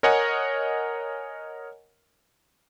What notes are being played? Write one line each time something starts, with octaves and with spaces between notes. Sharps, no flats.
A#4 C#5 D#5 F#5 G#5 A#5